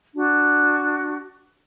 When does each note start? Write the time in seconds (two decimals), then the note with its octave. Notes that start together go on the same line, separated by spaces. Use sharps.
0.12 D4 F#4